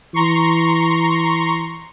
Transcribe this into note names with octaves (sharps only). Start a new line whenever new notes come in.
E3 A#5 C6 C#6